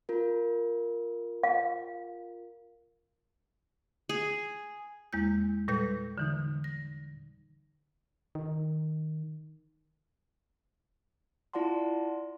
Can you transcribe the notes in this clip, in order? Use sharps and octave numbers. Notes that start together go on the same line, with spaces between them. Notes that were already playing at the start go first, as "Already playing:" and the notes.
F4 A#4
F5
G#4
E2 G#3 A#3 E4 G6
A#2 G3 A4 B4 G6
D3 E3 D#4
A#6
D#3
E4 F4 D5 F#5 A5 C6